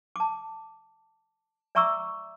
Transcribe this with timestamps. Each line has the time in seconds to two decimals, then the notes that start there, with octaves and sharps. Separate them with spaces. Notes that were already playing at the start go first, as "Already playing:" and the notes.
0.16 A5 D6
1.75 D5 E5 A#5 C#6 D6 E6